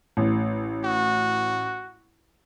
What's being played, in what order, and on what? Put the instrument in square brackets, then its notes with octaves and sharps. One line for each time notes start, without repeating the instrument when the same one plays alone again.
[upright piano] A1
[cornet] F#4